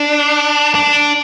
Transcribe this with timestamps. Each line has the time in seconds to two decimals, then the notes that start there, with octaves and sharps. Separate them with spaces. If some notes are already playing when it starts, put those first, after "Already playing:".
Already playing: D4
0.75 D4